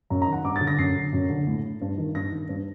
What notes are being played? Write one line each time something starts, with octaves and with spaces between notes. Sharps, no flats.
F#2 A#5
A#5
D#3
F#5
G2 D6
A6
D3
A#6
F#2 C7
D3
F#2
D3
A2
G2
D#3
G2 A#6
D#3
G2